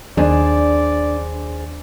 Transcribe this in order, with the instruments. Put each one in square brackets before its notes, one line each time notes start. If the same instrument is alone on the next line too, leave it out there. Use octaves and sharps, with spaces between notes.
[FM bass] D#2 [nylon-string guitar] D4 [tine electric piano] G#4 C5 G#5 [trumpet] D5